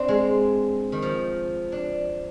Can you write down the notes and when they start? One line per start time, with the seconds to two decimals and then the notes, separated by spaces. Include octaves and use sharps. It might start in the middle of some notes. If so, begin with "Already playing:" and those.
Already playing: C4 D4
0.08 G#3
0.92 D#3
1.02 F3
1.72 D4